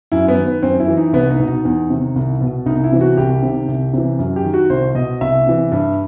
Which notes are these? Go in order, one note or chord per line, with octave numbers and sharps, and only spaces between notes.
F#2 E4
B3
D#3
B3
F#2 C4
E4
E3
D#4
C2 B3
D#4
B2
D#4
E2
C3 D#3
C2
B2
C2 D#4
D#4
E4
C3 E3
F#4
C2 G4
C3 D#3
C2
C3 E3
F#2
G4
D#3
F#4
C2 C5
B2 D#5
C2 E5
C3 E3
G2